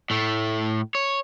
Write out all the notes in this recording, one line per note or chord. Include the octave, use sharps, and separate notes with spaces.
A2 A3
C#5